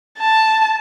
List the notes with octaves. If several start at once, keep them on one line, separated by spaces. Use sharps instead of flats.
A5